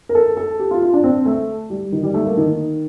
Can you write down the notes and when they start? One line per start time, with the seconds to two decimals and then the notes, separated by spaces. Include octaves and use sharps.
0.09 A#4
0.15 A4
0.37 A4
0.59 G4
0.71 F4
0.82 F4
0.93 D4
1.04 C4
1.26 A3
1.70 G3
1.92 D#3
2.03 G3
2.14 A3
2.25 A#3
2.37 D#3